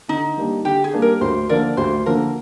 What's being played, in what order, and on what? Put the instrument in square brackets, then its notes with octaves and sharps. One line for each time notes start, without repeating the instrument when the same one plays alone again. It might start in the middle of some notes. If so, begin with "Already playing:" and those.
[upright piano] D3 [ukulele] D#4
[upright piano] G3 A#3 D4
[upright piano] D3 [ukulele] G4
[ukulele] G#4
[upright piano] G3 A#3 D4
[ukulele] A#4
[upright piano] D2 [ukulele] C5
[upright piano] D3 F3 A#3 [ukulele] A#4 D5
[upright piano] D2 [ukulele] C5
[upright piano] D3 F3 A#3 [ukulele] A#4